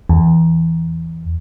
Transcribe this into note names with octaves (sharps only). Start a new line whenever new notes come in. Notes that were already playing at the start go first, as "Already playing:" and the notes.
E2